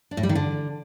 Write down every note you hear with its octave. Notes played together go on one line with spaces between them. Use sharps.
D4
A2
G3
D#3
D3